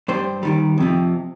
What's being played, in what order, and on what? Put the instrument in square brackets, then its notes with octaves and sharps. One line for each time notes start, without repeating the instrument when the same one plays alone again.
[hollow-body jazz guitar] G2 G3 C5
D#2 D#3 G3
F2 C3 F3